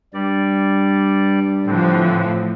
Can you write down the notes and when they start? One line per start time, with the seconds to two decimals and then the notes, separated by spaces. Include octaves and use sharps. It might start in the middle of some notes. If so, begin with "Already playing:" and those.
0.14 G2 G3 D5
1.66 A2 D3 E3 F3 C4